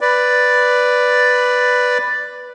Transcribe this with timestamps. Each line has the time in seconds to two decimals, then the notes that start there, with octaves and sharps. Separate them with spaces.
0.01 B4 D5